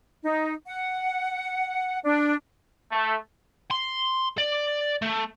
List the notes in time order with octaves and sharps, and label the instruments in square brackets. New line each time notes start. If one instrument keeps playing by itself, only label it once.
[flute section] D#4
F#5
D4
[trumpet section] A3
[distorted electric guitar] C6
D5
A3